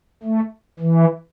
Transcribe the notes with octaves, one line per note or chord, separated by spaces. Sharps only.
A3
E3